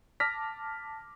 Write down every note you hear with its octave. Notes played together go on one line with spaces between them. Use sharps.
A5 D6 F6 A#6 B6